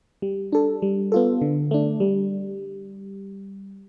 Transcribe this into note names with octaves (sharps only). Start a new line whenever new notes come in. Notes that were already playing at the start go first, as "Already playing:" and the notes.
G3
D4 A4
G3
B3 F4 A4
D3
A3 D4
G3